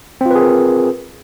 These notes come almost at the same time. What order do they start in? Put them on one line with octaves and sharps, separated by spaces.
C4 F4 B4 G#4 A#4